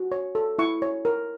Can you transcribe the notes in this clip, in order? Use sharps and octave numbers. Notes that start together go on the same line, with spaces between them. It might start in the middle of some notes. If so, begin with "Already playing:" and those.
Already playing: F#4
C#5
A4
E4 C#6
C#5
A#4